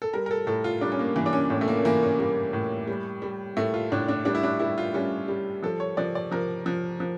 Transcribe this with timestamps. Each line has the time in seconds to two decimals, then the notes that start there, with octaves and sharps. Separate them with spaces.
0.02 A4
0.13 G3 A#4
0.26 A#4
0.31 A4
0.47 A2 A4
0.64 F4
0.81 G3 D4
0.92 C#4
0.99 A#3
1.16 E3 A#3
1.26 D4
1.33 C#4
1.50 A2 C#4
1.61 A3
1.68 A#3
1.77 C#4
1.85 E3 A#3
2.03 C#4
2.19 G3 A#3
2.53 A2
2.87 G3
3.22 G3
3.57 A2 A3
3.74 F4
3.92 A2 D4
4.08 D4
4.25 G3 D4
4.35 E4
4.43 D4
4.59 G3 E4
4.78 F4
4.94 G3 C#4
5.28 G3
5.63 F3 A4
5.80 C#5
5.97 F3 D5
6.15 D5
6.32 F3 A#4
6.66 F3
7.00 F3